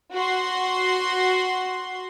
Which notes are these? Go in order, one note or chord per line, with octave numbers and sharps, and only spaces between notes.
F#4 C6